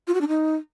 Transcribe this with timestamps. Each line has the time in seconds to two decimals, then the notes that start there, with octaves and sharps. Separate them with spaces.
0.07 F4
0.14 F#4
0.21 D4
0.28 D#4